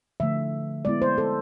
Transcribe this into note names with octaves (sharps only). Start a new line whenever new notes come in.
D3 F3 A3 E5
G#3 B3 E4 D5
C5
A4